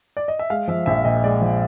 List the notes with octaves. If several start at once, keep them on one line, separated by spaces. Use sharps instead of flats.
D5
D#5
E5
G#3 F5
F3 E5
A#1 E5
A#2 D#5
G#3 D5
F3